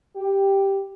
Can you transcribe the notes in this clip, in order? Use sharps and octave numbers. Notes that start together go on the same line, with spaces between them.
G4